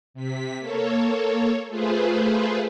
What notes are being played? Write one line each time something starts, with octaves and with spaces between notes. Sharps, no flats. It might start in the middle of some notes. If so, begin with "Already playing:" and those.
C3 B6
A#3 A4 C#5
A3 F4 G#4 B4 C5